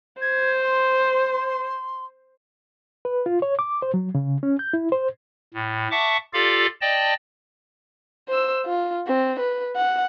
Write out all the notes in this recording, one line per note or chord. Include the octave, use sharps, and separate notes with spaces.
C5 G#6
C6
B4
F4
C#5
D6
C5
F#3
C#3
C#4
G6
E4
C5
A2
E5 F#5 A5 C#6 D6
F4 G4 A4 D5 F5
D5 D#5 G5 A5
C5 E6
F4
C4
B4
F#5